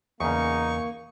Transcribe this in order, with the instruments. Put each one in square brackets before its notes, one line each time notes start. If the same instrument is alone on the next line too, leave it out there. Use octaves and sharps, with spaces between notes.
[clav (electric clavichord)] E2 C#3 [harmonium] A#3 [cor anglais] D#4 [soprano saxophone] C#6